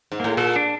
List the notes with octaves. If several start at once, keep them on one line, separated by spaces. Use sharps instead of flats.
G#2
A2 A#3
A#2 A4
D4